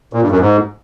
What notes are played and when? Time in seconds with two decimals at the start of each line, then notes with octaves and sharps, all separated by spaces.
0.13 A#2
0.22 G2
0.31 F#2
0.40 G#2